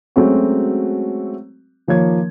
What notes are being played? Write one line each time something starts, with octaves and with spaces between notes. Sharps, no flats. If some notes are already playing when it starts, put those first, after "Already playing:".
F#3 G#3 A3 C4 C#4 F#4
D#3 F3 A#3 C#5 G#6